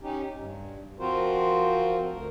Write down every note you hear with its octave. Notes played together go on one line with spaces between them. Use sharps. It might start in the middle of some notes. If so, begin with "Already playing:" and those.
C#4 D#4 G4
G2
F3 C4 F4 F#4 A#4 C5
D2 A#4